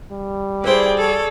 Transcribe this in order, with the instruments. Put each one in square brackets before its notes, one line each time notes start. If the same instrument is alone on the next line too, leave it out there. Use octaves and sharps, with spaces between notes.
[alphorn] G3
[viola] E4 G5 [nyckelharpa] G#4 D5 [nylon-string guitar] B4 C5
[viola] A4 C#5